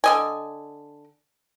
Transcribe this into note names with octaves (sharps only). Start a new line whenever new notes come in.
D3 D#5 G#5